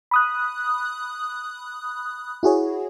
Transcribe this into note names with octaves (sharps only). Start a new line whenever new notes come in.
B5 D#6 F#6
E4 F#4 G#4 C#5